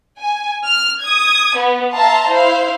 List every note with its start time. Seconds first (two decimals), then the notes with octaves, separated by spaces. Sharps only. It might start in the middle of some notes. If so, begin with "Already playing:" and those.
0.20 G#5
0.66 F6
1.02 D#6 G#6
1.57 B3
1.94 E5 F5 A5 A#5 C6
2.29 E4 C5 F5